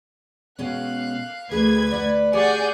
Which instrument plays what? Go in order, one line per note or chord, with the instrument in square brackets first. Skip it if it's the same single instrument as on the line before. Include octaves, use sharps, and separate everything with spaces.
[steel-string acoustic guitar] B2 G#3 C#4 [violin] F5 F#6
[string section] D2 G#6 [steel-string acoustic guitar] G#4 A#4 [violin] B4
[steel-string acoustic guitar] D5 F5 F#5
[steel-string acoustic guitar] G4 [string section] G#4 D5 F#5 [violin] C#6 G6